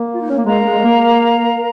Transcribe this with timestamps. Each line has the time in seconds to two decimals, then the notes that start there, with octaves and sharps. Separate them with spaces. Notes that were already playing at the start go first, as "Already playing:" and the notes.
Already playing: A#3
0.14 F4
0.21 D#4
0.29 C#4
0.36 A#3
0.44 G#3 A#4 F5 A#5
0.64 G#3
0.79 G#3
0.83 A#3